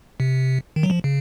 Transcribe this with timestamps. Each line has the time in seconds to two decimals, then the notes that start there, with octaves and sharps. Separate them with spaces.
0.20 C3
0.76 D#3
0.83 F#3
0.90 F3
1.04 C#3